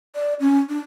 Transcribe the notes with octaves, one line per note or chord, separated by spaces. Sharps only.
D5
C#4
D4